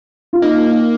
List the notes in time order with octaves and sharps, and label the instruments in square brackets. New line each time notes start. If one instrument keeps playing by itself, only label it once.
[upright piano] F4
[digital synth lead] A#3 [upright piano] D#4